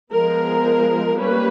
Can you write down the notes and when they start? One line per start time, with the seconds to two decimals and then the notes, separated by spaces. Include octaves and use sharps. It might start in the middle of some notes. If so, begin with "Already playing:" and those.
0.11 F3 G#3 B3 A#4
1.15 G3 A#3 C#4 B4